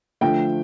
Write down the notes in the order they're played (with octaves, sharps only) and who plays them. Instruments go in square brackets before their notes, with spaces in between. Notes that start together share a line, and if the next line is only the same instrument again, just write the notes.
[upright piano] D3 F3 A3 G5